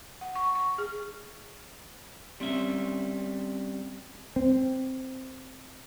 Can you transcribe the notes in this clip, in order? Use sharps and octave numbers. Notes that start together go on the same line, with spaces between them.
F#5
C#6
C#6
G#4
G3 C4 C#4 E5
C4